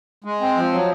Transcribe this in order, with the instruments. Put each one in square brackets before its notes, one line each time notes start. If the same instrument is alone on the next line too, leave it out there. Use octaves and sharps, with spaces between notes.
[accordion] G#3
C4
F3
F#3